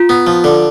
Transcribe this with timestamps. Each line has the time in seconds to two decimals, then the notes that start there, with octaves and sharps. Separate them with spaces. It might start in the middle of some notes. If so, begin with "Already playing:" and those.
Already playing: F4
0.09 B3
0.27 F3
0.44 D3